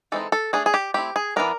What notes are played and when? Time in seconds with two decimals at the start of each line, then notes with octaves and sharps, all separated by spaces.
0.12 E3 G#3 C4 D#4 A4
0.32 A4
0.53 A3 D4 G#4
0.66 G#4
0.74 G4
0.94 A3 C4 E4 G4
1.16 G#4
1.36 E3 G3 B3 D4 A#4